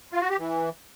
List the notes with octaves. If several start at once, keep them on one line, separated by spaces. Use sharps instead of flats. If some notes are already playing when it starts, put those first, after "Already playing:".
F4
F#4
G4
E3